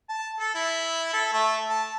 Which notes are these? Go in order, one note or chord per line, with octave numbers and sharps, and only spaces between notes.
A5
A4
E4
A4
A3
A5